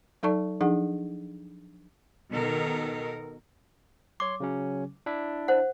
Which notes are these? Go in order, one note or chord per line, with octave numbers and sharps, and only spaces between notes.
F#3 D#4 A4 D5 A5 C#6
F3 D4 D#4 G#4 F#5
B2 D#3 A4 A#4
C#5 C6 D6
C#3 F#3 C#4
D4 E4 E5
C5 F#5